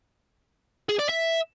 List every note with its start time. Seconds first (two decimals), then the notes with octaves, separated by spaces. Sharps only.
0.89 G#4
0.99 D5
1.09 E5